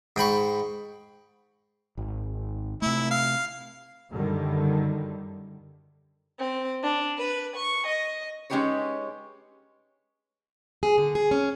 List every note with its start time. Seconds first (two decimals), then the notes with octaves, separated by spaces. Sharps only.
0.16 G#2 G5 B5 C#6
1.97 G#1
2.82 C3 A3 E4
3.11 F5
4.11 F#2 D3 D#3 G3
6.39 C4
6.82 D4
7.17 B4
7.55 C#6
7.87 D#5
8.50 G#3 C#4 D#4 G4 B4 C#5
10.83 G#4
10.98 D3
11.15 G#4
11.31 C#4